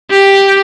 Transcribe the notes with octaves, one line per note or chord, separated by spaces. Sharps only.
G4